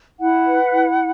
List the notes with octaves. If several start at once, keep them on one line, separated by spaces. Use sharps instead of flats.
E4 F#5
B4
E4